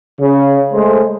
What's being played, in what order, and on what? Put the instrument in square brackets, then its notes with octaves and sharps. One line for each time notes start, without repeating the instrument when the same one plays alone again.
[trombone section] C#3
G#3 A3 C5